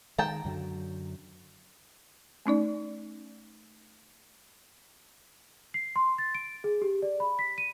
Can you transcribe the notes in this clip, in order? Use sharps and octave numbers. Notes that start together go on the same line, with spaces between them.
D#3 G#3 G5 A5 A#5
F#2 D3 F#3
A3 C#4 D#4 D5
C7
C6
A6
D7
G#4
G4
D5
B5
B6
D#7